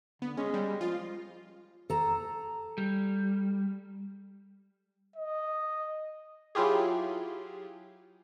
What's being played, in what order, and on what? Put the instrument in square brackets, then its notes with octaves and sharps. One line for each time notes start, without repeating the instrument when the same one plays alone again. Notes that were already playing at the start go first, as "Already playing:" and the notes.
[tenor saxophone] D3 [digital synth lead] B3
[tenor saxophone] G#3 [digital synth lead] C#4
[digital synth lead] G3
[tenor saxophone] F3 [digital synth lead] F4
[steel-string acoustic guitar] A4 A#5
[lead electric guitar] G3
[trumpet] D#5
[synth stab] F#3 E4 F4 G4 G#4